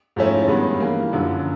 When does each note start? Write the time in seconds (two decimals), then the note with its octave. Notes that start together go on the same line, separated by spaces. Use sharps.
0.16 G#2 F3 A3 C#4 E4
0.48 G2 D#3 G#3 B3
0.80 E3 G3 A#3
1.12 F#2 D3 F3